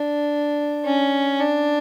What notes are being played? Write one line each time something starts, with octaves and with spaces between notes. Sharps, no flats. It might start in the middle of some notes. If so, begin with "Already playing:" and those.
Already playing: D4
C#4
D4